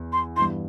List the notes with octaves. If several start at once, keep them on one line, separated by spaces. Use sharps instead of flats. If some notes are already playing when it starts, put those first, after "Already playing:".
Already playing: E2
C6
G2 E3 B3 E4 C6